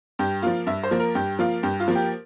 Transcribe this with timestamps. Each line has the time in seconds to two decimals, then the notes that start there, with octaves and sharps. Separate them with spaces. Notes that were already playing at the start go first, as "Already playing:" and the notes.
0.19 G2 G4
0.42 F3 A#3 F4
0.67 G2 E5
0.83 C5
0.91 F3 A#3
1.00 A#4
1.15 G2 G4
1.39 F3 A#3 F4
1.63 G2 G4
1.80 F4
1.88 F3 A#3
1.95 G4